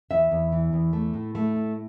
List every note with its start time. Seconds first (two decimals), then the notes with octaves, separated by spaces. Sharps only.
0.11 E2 E5
0.32 E2
0.52 E3
0.73 E2
0.93 A3
1.14 A2
1.35 A3
1.56 A2